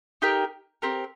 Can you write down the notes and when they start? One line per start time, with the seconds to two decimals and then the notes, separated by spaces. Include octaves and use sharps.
0.22 D#4 G4 A#4 G5
0.82 C4 G4 A#4